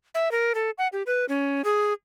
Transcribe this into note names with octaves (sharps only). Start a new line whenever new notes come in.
E5
A#4
A4
F#5
G4
B4
C#4
G#4